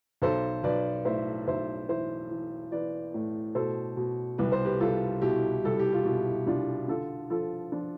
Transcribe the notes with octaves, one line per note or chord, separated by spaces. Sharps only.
B1 A4 C5
B1 B4 D5
A2 C5 E5
B1 C5 E5
E3 C5 E5
E3
E3 B4 D5
A2
B2 A4 C5
B2
C2 B4
C5
G4 B4
C2 F4 A4
B2 E4 G4
C2 A4
G4
F4
B2 E4
C2 D4 F4
D3 F4 A4
F3 F4 A4
F3 D4 F4